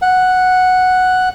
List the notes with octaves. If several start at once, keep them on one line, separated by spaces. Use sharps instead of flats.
F#5